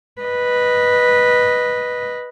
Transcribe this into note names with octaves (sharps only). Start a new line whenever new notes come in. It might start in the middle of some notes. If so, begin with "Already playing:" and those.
B4 D#5